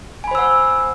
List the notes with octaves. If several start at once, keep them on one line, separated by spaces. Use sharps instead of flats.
C5 F#5 G#5 B5 E6